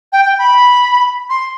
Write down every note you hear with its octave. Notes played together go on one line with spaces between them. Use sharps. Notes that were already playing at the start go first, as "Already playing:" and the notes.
G5
G5
B5
C6